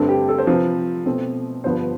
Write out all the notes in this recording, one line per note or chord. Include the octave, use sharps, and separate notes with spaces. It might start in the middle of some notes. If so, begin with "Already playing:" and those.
Already playing: G2 D3 A3 C4
G4
A4
C5
C3 F3 C4 B4
B2 A3 C4
G2 D3 F3 B3 C5